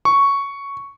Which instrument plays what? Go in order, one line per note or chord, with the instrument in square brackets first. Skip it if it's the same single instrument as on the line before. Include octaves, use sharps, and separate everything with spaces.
[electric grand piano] C#6